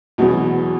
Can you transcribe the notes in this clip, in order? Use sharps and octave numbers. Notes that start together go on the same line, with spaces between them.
E2 B2 F#3 B3